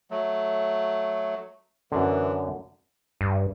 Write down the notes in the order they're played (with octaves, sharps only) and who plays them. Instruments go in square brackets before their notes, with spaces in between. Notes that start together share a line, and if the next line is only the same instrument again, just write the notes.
[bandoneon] F#3 A3
[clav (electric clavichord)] F#2 D3 [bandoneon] E3
[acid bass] G2